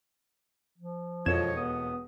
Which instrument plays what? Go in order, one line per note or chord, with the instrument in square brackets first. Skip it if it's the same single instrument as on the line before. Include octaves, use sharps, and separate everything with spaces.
[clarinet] F3
[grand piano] E1 A4 D#5 [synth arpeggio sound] F2 G#6 E7 [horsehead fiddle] F4 C#5
[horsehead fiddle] B3 [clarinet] D#6